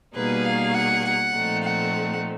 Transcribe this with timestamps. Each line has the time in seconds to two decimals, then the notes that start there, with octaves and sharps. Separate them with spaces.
0.15 B2 G3 A#3 D#4 G#4 B4
0.45 F5
0.74 F#5
1.04 F#5
1.33 A#2 F3 A3 C4 D#4
1.63 F#5